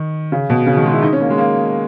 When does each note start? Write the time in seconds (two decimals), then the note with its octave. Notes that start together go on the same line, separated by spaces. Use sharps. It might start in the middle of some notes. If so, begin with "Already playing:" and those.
Already playing: D#3
0.32 C#3
0.50 B2
0.67 C#3
0.77 D#3
0.85 G#3
0.93 E4
1.03 D#4
1.12 C#4
1.21 A#3
1.30 G#3
1.38 A#3